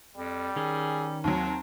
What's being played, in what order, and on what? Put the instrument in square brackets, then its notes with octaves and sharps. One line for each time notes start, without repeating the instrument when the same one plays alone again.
[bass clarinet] F2 [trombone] G3
[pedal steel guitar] D#3 C#4 [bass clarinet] G#4
[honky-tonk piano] D#2 F#3 [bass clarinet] C4